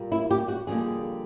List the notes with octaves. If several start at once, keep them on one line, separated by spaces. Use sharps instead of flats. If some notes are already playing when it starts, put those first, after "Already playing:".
Already playing: A#2 G3 A#3
E4
G4
F#4
F2 D3 G3 A#3 G#4